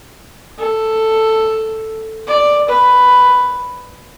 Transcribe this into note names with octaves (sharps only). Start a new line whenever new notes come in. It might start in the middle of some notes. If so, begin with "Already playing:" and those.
A4
D5
B4